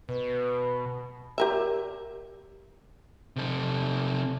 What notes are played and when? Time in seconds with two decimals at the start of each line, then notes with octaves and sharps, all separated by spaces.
0.09 B2 B4
1.38 G4 A#4 E5
3.36 C3 A4